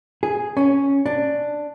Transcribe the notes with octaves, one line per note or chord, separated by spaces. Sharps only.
G#4
C#4
D4